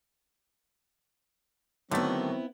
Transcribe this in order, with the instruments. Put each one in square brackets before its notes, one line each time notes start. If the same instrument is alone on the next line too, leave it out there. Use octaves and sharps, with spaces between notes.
[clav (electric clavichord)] D3 A3 [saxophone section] D#3 F#3 [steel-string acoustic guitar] B3 E4 [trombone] C4